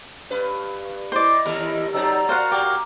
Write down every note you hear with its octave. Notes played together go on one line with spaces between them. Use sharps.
G2 B4
E4 C5 D5 D#5
D#2 G3 A3 A#4
F#3 C4 D#4 G4 A4 D5 A#5
F#4 A#4 C5 F5 F#5
A#3 G4